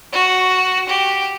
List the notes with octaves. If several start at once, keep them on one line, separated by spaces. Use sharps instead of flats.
F#4
G4